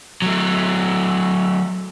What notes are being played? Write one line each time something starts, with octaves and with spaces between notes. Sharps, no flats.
F#3 A3